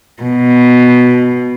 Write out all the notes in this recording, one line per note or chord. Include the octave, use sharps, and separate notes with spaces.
B2